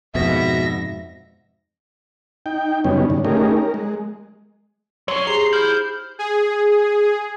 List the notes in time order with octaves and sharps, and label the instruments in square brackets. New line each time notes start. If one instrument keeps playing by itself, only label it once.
[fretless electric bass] F2 G#2 [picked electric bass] B2 [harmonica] E5 [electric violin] A#6
[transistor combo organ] D#4 G5
F#2 C#3 G3 B3 C#4 D#4
G2 D3
A3 C#4 D#4 G4 G#4 A#4
A#4
G#3
[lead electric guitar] F#3 C#4 [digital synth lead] C#5 [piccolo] C6
[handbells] G4 G#4 C5 [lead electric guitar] A#5 [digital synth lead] C7
[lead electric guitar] E4 [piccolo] F6 [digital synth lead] G6
[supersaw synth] G#4